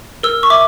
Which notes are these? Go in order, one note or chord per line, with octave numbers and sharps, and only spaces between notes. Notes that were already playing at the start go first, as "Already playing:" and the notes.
A#4 E6
C#6
E5 D6